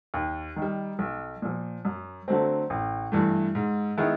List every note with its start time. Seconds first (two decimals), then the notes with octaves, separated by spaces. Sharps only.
0.14 D#2
0.56 D#3
0.62 G3
0.99 B1
1.42 A#2 F3
1.85 F#2
2.28 D3 F#3 A3 C4
2.70 A1
3.12 G2 E3 A3
3.55 G#2
3.97 D#3 G#3 B3 E4